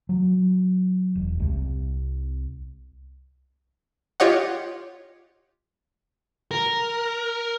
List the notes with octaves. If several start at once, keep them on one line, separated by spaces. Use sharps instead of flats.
F#3
E1
C2
F4 G4 C#5 D#5 F#5
A#4